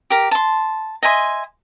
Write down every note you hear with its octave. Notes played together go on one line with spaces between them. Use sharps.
G4 A#4
A5 C6
D#5 E5 G#5 C6